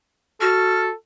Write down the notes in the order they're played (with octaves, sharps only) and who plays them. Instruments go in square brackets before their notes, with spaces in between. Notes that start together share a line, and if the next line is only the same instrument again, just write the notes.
[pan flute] F#4 [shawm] A4 [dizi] F6